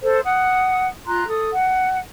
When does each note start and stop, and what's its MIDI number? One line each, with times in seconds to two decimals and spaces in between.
0.02 0.18 69
0.02 0.18 72
0.23 0.88 78
0.23 0.88 87
1.06 1.25 65
1.06 1.25 82
1.06 1.25 84
1.06 1.25 90
1.27 1.50 69
1.27 1.50 87
1.52 1.99 78